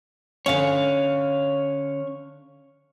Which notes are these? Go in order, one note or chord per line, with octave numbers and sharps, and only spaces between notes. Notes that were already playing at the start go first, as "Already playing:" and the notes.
D3 C#4 C#5 F5